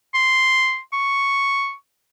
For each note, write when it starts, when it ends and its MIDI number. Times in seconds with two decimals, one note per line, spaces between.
0.14 0.79 84
0.93 1.74 85